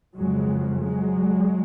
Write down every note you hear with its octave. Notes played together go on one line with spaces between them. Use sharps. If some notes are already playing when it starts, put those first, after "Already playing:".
F2 C#3 F#3 G#3
F#3 G#3